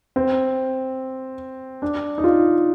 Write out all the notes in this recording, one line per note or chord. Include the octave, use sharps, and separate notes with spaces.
C4
D4
D#4
F4